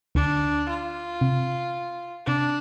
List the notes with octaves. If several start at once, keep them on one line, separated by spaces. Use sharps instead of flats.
D2 D3 D4
F4
C3
C3 D4